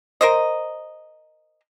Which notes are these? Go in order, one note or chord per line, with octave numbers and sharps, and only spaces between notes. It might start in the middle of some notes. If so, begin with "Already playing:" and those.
A#4 C5 D#5